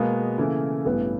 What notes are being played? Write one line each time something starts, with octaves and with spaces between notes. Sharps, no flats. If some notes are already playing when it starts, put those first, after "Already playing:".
Already playing: B2 G#3 A#3 B3
C#3 E3 A3 C#4 E4
A1 G2 E3 A3 B3